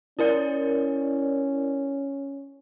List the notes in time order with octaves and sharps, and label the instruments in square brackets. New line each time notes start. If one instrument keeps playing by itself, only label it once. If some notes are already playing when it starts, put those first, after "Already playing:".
[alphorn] C#4 [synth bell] E4 A#4 D5